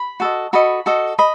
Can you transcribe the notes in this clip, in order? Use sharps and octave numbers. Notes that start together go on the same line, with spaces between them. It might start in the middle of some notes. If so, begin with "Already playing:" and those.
Already playing: B5
F#4 A4 D#5
F#4 A4 D#5 B5
F#4 A4 D#5
D#5 B5